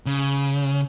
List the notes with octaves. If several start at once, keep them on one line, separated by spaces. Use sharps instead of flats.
C#3